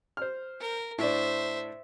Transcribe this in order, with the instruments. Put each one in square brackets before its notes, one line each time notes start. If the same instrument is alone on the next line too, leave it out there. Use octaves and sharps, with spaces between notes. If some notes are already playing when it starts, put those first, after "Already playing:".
[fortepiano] C5 F6
[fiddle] A#4
[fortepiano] A2 D4 [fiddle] C5 E5